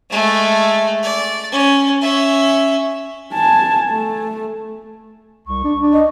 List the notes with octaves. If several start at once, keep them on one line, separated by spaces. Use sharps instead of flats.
G#3 A3
D5
C#4
C#4 E5
G#5 A5
A3
C2 C#6
D4
D4
D#5